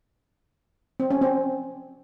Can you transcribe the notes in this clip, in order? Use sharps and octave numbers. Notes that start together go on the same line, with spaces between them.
C4
C#4
C4